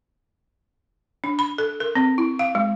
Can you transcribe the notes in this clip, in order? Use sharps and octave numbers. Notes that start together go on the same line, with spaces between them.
D4
B5
A4
A#4
C4
E4
F5
G#3